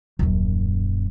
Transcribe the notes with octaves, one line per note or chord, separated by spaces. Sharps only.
D#1 F#2